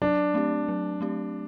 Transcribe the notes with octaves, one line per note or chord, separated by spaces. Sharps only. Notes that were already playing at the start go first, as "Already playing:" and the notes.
F#3 D4
A3 C4 G4
F#3
A3 C4 G4